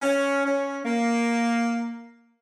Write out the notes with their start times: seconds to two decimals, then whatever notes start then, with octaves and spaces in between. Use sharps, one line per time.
0.03 C#4
0.45 C#4
0.84 A#3